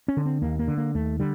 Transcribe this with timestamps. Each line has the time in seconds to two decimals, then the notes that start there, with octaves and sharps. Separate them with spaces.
0.08 C#4
0.17 D3
0.26 C4
0.42 D#2 A#3
0.59 A#3
0.68 D3
0.77 A#3
0.94 D#2 A3
1.20 D3 G3